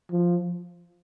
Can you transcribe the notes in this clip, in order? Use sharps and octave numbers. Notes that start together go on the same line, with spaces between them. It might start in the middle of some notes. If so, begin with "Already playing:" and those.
F3